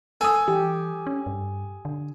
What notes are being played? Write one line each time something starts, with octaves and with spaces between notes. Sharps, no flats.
A4 G#5 D#6
E3 G4
C#4
G2
D3